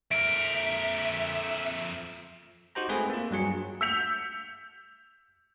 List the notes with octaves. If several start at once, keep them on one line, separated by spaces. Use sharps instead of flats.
F2 A#4 E5 D7
D#4 F#4 G4 C5 G5 A#5
G#3 A3 C4 G#4 B4
A#3 F4
G2 F#3 G#4 C#7
E6 G6 B6 C#7 F7